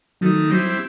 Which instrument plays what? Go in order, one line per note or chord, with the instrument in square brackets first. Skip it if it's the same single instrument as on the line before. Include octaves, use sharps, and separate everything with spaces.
[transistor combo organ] D#3 A3 D#4 [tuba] F#3
[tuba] F#3 [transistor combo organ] G3 C4 E4